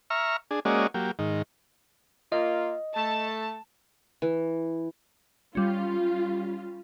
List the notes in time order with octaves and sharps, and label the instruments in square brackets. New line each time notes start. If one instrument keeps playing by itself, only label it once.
[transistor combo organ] E5 A#5 C#6 F6
D4 G#4
G#3 A#3 C#4 F#4 D5 D#5
F#3 A#3 G4
G#2 D#3
[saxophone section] A#3 F4 [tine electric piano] D#5
[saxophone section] A3 [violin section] A5
[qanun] E3
[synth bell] G3 C#4 [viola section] F4